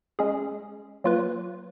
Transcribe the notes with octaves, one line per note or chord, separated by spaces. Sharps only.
G#3 C#4 G#4
F#3 A#3 F4 B4